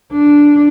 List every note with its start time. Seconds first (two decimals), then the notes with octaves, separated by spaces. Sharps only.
0.13 D4